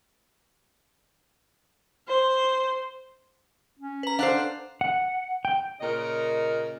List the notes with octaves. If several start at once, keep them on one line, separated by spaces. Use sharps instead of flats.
C5
C#4
B4 A#5
D4 C5 F5 F#5 F#6
F#5
G5
A#2 C#3 A#4 D#5